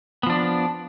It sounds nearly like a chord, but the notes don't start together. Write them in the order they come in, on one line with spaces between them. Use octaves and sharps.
B3 F3 D4